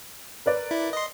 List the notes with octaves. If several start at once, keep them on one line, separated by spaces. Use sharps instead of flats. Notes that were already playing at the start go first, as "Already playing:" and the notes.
A#4 B4 D5
E4
D#5 C6